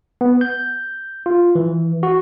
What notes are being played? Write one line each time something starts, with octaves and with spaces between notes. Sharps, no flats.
B3
G6
F4
E3
F#4